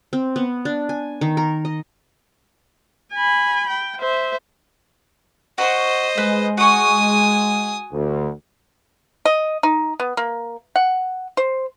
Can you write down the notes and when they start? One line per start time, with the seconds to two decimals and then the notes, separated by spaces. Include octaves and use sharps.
0.13 C4
0.36 B3
0.65 D4
0.89 G#5
1.21 D#3
1.37 A#4
1.65 D#5
3.14 G#5 B5
3.69 G5
3.99 C5 E5
5.58 F#4 C5 D#5
6.18 G#3 B4
6.57 F#4 G#5 C#6 D#6
7.92 D2
9.25 D#5
9.63 D#4
10.00 B3
10.17 A#3
10.76 F#5
11.37 C5